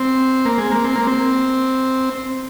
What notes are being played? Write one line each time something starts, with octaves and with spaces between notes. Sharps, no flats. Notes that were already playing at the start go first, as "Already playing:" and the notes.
Already playing: C4
A#3
G#3
A#3
C4
A#3
C4